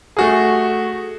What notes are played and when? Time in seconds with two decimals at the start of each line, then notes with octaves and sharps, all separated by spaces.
0.17 A3 F#4 G#4